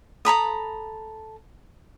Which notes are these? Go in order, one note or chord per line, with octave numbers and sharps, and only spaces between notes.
A4 A#5 B5 D#6